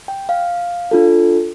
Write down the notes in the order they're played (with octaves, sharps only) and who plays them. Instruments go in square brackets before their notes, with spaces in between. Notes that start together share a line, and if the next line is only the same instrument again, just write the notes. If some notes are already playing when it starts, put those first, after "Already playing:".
[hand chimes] G5
F5
D4 F4 A4